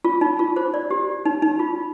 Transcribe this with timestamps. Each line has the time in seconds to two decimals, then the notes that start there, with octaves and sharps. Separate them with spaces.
0.04 F4
0.21 D#4
0.39 F4
0.56 C5
0.74 D5
0.91 G4
1.25 D#4
1.42 D#4
1.59 F4